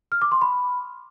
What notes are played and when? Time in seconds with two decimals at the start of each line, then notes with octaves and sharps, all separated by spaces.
0.12 F6
0.22 D6
0.32 C6
0.42 B5